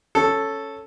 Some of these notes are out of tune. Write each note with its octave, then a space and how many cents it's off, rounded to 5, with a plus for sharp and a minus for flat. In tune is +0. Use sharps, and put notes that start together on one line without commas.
C#4 +0 A4 +0